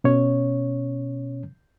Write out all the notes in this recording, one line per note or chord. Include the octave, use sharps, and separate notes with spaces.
B2 C#4 C#5